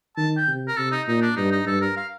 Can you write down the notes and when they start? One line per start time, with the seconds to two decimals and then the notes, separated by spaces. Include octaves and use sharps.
0.17 D#3 A5
0.37 G5
0.47 C3
0.68 A#4
0.76 C3 A4
0.92 D#4
1.07 A#2 D#4
1.22 D4
1.36 G2 D#4
1.52 D#4
1.66 G2 A4
1.81 A#4
1.97 F5